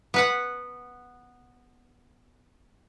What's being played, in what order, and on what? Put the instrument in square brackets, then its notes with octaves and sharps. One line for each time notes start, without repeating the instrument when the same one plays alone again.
[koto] B3 B4 F#5